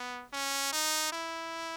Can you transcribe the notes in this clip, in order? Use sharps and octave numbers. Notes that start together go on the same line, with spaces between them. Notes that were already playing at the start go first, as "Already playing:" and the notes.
Already playing: B3
C#4
D#4
E4